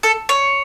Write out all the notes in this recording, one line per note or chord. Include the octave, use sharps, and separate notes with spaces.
A4
C#5